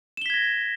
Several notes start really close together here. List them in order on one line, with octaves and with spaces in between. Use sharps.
E7 G7 B6 G#6 A#6